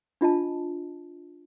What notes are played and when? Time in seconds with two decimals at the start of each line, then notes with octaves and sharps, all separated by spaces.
0.21 D4 F4 D#5 A5